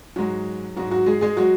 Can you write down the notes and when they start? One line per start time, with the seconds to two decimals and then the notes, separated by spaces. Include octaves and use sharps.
0.16 G#2 F#3 G#3 F#4
0.76 G#2 F#3 G#3 F#4
0.91 F#3 F#4
1.06 G#3 G#4
1.21 G#3 G#4
1.36 F#3 G#3 F#4